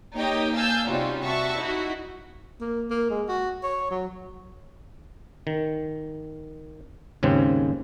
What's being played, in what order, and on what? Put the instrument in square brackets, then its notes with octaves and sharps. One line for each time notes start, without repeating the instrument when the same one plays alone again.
[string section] A#3 D#4 G4 C#5 D#5 G5
F5 G#5 A5 E6 G6
C3 G3 C#4 D#4 F4 F#4
F#4 E5 A5 C#6
D#4 E4 F#4
[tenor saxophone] A#3
A#3
G#3
F#4
C#5
F#3
[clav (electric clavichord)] D#3
D#2 G#2 C#3 C4